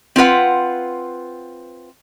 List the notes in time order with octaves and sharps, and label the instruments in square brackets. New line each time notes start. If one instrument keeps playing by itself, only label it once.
[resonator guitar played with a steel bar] C4 F4 B4 F#5